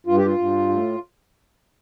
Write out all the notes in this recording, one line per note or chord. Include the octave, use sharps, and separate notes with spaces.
G2 F4
G4
F4
G2
A2